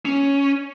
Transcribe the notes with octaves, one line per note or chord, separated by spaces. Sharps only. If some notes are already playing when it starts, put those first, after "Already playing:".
C#4